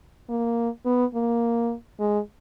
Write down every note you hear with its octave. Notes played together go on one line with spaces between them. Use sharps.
A#3
B3
A#3
G#3